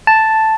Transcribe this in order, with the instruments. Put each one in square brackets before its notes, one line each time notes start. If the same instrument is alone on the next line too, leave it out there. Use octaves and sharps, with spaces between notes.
[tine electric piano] A5